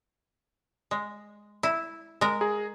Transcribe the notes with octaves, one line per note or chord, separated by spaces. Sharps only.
G#3
E4
G#3 A#4
G#4 A#5